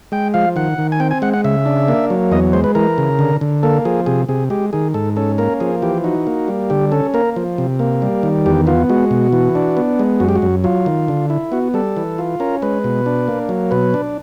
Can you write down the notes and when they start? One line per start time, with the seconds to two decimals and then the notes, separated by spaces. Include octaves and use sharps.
0.12 G#3 G5
0.34 F3 F5
0.56 D#3 F#5
0.78 D#3
0.92 G#5
1.00 C4 G5
1.11 G#5
1.22 G#3 F#5
1.33 F#5
1.44 C#3 E5
1.66 D4
1.88 A#3
2.10 F#3
2.32 E2 D#5
2.53 G#3 C5
2.64 B4
2.75 E3 A#4
2.98 C#3
3.19 D3
3.41 D3
3.63 A#3 A4
3.85 F3 G#4
4.06 C3 G#4
4.29 C3 G#4
4.50 G#3 G4
4.73 D#3 G#4
4.94 G#2 A4
5.16 C#4 A4
5.38 A#3 A#4
5.60 F3 G#4
5.82 E3 G4
6.04 D#4 F#4
6.27 A#3
6.48 G3
6.70 D3 G4
6.92 C#4 A4
7.14 A#3 A#4
7.36 F3
7.58 C3
7.79 A#3
8.02 G3
8.23 D#3
8.46 E2 G4
8.67 B3 F4
8.89 G#3 F#4
9.11 B2
9.33 E3
9.55 D4
9.77 B3
9.99 G#3
10.20 F#2 F#4
10.29 G4
10.36 F#4
10.42 F#2
10.64 F#3 F4
10.86 D#3
11.08 D3
11.30 E4
11.52 B3 F#4
11.74 G3 A4
11.96 E3
12.18 F4
12.40 C#4 A#4
12.62 G#3 B4
12.84 B2
13.06 D4
13.28 A#3
13.49 F#3
13.71 B2 B4
13.94 D4